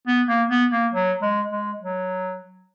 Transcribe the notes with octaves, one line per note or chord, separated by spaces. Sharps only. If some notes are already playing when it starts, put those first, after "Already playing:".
B3
A#3
B3
A#3
F#3
G#3
G#3
F#3